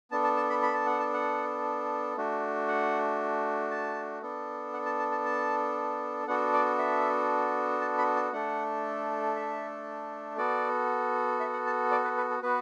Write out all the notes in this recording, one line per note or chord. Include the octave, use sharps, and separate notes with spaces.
B3 D4 A4 A5
A5
A5
B5
B5
A5
F#5
A5
F#5
A3 D4 F#4
F#5
A5
B3 D4 A4
F#5
A5
A5
A5
A5
B3 D4 F#4 A4 F#5
D5
E5
A5
B5
A5
A3 D4 A4 F#5
E5
B3 F#4 A4 D5
E5
F#5
A5
D5
B4
B4
A4
B3 F#4 B4